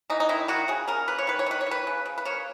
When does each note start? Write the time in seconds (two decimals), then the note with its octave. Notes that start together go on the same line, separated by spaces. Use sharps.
0.10 E3 D#4
0.20 D#4
0.29 D#3 E4
0.48 D#3 F#4
0.68 C#3 G#4
0.88 C#3 A#4
1.08 A#3 B4
1.18 C#5
1.27 D#3 B4
1.39 C#5
1.46 D#3 B4
1.61 C#5
1.66 D#3
1.71 B4
1.87 C#3
2.06 C#3
2.18 B4
2.25 A#3 C#5